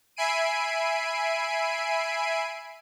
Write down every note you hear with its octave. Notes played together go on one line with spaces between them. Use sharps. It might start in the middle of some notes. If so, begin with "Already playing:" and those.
E5 G#5 B5 C7 D7 D#7